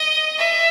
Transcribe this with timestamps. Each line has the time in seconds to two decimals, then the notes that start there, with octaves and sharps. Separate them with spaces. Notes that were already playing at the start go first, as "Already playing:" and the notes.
Already playing: D#5
0.39 E5